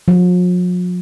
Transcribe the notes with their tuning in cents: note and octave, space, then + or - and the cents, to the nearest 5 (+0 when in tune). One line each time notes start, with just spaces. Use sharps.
F3 +45